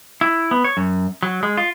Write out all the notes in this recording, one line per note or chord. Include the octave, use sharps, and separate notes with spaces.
E4
B3
C#5
F#2
F#3
G#3
F4